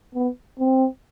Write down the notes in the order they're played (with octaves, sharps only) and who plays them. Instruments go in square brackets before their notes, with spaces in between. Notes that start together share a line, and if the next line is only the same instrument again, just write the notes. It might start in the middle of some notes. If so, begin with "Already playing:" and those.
[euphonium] B3
C4